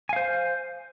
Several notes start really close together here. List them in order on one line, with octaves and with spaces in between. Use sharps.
G#5 F5 C5